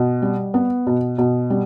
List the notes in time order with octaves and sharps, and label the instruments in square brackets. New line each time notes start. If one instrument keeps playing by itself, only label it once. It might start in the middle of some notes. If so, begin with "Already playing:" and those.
Already playing: [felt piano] B2
G3
B3
B2
B2
G3